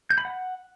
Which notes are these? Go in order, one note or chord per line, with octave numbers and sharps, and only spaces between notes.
G6
B5
F#5